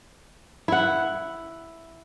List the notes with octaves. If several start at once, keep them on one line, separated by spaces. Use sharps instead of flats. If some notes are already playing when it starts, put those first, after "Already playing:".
E4 F#5